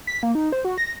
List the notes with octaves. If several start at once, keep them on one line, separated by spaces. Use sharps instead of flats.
B6
A#3
D#4
C5
F#4
A#6